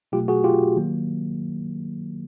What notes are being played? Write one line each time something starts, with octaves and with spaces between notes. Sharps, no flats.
B2 F#3 A3 F4 G4
F#4 G#4
F4 G4
D#3 F#3 A#3